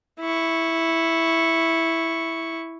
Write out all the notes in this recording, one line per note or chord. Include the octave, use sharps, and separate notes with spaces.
E4 C#6